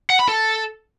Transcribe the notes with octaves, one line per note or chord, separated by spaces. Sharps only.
F#5
B5
A4